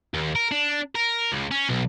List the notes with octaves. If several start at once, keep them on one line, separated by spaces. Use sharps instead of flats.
D#2
A#4
D4
A#4
C#2
C#4
B1